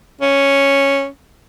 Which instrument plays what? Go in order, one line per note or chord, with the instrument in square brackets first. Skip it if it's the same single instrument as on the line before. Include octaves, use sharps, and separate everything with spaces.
[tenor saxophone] C#4